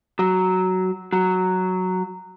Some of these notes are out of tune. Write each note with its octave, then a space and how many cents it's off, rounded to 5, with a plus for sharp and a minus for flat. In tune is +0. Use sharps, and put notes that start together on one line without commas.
F#3 +5
F#3 +0